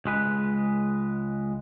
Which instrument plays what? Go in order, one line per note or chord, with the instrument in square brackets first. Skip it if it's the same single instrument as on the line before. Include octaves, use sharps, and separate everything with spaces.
[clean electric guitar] C#2 G#3 B4